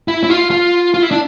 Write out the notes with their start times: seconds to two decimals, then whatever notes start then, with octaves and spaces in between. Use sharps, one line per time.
0.08 E4
0.24 E4
0.29 F4
0.51 F4
0.94 F4
1.03 E4
1.11 D4